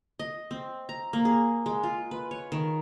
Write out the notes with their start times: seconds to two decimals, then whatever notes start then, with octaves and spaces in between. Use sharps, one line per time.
0.19 D#5
0.51 C4
0.89 A#5
1.13 A#3
1.25 G#4
1.66 G#3
1.83 F4
2.11 B4
2.31 C#5
2.52 D#3